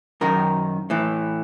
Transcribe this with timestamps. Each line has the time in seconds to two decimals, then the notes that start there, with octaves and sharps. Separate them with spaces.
0.21 F#2 D#3 A#4
0.90 A2 E3